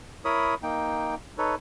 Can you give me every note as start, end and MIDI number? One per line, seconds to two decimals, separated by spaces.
0.25 0.54 64
0.25 0.54 70
0.25 0.54 73
0.25 0.54 83
0.25 0.54 87
0.63 1.15 58
0.63 1.15 63
0.63 1.15 79
1.38 1.55 63
1.38 1.55 69
1.38 1.55 71
1.38 1.55 73